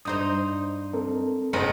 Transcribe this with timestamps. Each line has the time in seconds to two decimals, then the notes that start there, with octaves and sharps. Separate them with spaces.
0.05 G2 D#4 C5 C6 D#6
0.93 C4 A4 A#4
1.53 F#1 G2 B3 D#4 C#5